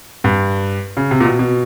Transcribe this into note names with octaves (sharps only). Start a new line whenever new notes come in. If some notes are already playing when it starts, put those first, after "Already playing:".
G2
C#3
C3
A#2
B2
B2